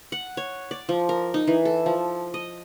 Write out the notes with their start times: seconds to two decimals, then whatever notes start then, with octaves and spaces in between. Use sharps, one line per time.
0.12 F#5
0.37 C#5
0.71 D5
0.89 F3
1.09 A#4
1.34 D#4
1.47 E3
1.65 A4
1.86 F3
2.34 D#5